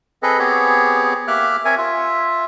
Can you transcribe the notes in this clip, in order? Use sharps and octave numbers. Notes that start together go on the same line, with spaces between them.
C4 G#4 A4 B4 D#5
B3 C4 G4 G#4 C#5
A#3 G4 E5 D6 F6 F#6
C4 A#4 C#5 E5 G#5
F4 E5